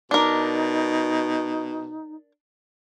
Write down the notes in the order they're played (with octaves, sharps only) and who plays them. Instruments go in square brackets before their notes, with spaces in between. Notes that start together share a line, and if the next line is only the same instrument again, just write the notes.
[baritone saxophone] B2 [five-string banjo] D4 A#4 [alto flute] D#4